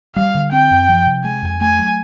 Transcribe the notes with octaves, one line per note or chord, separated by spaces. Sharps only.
G3 F5
D3
C4 G5
F#2
F3
C3
G#3 G#5
F2
A3 G#5
F#3